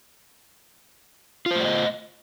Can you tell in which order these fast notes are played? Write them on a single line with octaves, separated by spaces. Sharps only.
F4 C5 A3 D5 D#5